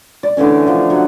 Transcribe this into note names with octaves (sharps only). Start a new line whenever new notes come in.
D5
D3 E3 A3 C#4
D3 F3
F#3 F#5